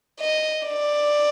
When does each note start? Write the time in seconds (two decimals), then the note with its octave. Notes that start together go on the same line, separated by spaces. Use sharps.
0.20 D#5
0.66 D5